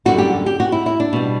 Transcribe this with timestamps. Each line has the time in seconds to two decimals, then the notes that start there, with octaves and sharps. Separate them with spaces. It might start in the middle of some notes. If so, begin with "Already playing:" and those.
0.05 F#2 D3 G3 F#4
0.18 G4
0.46 G4
0.60 F#4
0.72 E4
0.86 E4
1.00 D4
1.13 B2 G3